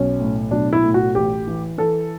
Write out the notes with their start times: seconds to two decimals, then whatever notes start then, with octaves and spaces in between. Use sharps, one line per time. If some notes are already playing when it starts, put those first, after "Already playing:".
Already playing: B1 C#4
0.21 A2
0.51 B1 D4
0.73 E4
0.84 A2
0.94 F#4
1.15 A1 G4
1.47 E3
1.78 E3 A4